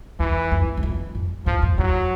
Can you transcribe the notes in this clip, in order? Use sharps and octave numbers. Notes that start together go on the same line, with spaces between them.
E2 E3
F2
E2
F2
F2
E2 F3
F2
E2 F#3